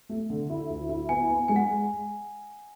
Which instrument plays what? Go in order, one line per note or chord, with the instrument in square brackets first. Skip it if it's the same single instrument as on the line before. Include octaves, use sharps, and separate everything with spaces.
[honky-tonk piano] A3
D3
E4
D2
E4
[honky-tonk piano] B3 [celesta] G#5
[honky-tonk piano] B3
[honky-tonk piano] G#3 [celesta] G#5
[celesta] F#5